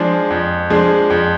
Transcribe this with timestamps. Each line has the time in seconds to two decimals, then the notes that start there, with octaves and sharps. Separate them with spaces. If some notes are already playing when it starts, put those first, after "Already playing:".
Already playing: F3 G#3 D4 G#4
0.30 F2
0.70 F3 G#3 D4 G#4
1.10 F2